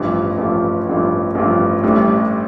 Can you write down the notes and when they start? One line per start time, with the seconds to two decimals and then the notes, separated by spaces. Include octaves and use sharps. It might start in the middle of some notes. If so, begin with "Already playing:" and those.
Already playing: A1 G2 F3
0.38 A1 G2 F3
0.87 A1 G2 F3
1.35 A1 G2 F3
1.83 A1 A2 G3 D4